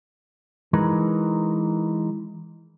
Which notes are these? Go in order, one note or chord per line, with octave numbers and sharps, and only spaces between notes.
E3 G#3 D#4 A#4 B4